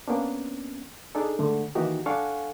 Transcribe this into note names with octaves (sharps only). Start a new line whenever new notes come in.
A#3 B3 C#4 D4
D4 D#4 G#4 A4
G#2 D3 A3
D#3 E3 A#3 D#4 F#4 G4
D4 A4 F5 F#5 G#5 C#6